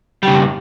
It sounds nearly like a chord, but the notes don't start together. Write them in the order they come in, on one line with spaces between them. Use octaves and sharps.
G3 C#3 G2